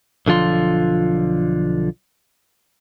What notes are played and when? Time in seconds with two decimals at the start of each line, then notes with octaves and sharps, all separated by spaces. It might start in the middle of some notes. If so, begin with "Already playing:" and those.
0.26 B1 D3 F3 F4 C6